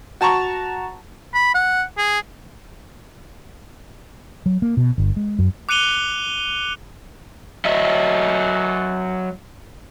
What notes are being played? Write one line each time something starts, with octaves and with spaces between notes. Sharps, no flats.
F#4 A5 A#5 C#6
B5
F#5
G#4
F#3
A#3
B2
G1
G#3
F#2
D6 F#6 C#7 D#7 F7 G7
F#3 D#5 E5